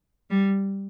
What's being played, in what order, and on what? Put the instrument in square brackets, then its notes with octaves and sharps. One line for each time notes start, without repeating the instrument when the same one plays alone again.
[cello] G3